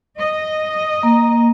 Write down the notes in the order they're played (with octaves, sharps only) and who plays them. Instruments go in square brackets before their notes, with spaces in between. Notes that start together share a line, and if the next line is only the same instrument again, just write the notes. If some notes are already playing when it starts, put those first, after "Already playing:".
[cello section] D#5
[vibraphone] A#3